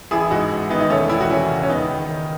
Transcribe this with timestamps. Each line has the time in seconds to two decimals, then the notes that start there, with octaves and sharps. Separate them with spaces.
0.11 A1 E4 G#4
0.31 G#2 D#4 F#4
0.50 A1
0.70 D#3 B3 D#4
0.80 D#4
0.90 E1 A3 C#4
1.09 D#2 E4
1.21 F#4
1.29 E3 C#4 E4
1.50 C#3
1.63 C#4
1.69 D#2 B3 D#4
1.90 D#3
2.09 D#3